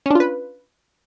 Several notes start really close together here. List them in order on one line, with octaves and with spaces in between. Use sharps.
C#4 D4 F4 B4